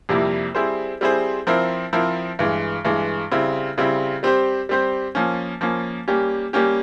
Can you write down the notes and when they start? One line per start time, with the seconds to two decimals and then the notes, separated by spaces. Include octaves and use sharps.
0.09 F2 C3 G3 A#3 E4
0.55 G3 C4 E4 G#4 C5
1.01 G3 C4 E4 G#4 C5
1.47 F3 C4 E4 A#4
1.93 F3 C4 E4 A#4
2.39 G2 E3 G#3
2.85 G2 E3 G#3
3.31 C#3 G3 C4 E4
3.78 C#3 G3 C4 E4
4.23 G3 C4 G4 C5
4.69 G3 C4 G4 C5
5.15 F3 A#3 C#4
5.61 F3 A#3 C#4
6.08 G3 A#3 C#4 G4
6.53 G3 A#3 C#4 G4